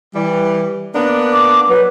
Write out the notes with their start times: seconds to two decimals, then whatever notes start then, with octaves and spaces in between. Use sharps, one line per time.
0.15 E3 G3
0.94 A#3 B3 D4
1.33 D6
1.69 F#3 B4